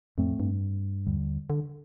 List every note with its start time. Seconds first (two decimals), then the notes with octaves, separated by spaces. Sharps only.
0.18 F2 A2 A3 C4
0.40 G2
1.07 D#2 D3 G3
1.50 D3